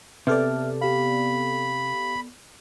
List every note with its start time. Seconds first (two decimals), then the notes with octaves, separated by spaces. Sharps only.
0.27 C3 B3 A4 D5 E5 F6
0.81 G4 F5 B5